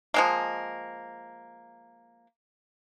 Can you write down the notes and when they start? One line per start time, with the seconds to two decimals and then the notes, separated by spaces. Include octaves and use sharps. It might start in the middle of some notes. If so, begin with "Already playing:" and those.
0.14 F3 G#3 A#3